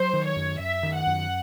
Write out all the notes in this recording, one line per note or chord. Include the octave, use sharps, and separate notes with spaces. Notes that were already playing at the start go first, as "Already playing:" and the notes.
Already playing: F#3 C5
D#3
C#5
F#2
F#2 E5
D#3
F#5
F#2